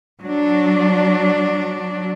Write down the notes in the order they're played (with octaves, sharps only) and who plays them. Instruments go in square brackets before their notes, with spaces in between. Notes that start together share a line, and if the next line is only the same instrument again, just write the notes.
[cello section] F#3 D4